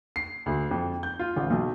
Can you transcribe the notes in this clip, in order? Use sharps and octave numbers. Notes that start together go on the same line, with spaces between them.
C7
D2
F2
G6
F4
A1
B1